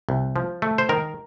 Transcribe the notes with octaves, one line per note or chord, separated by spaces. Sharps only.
C2
F3
A3
C5
D#3 A#4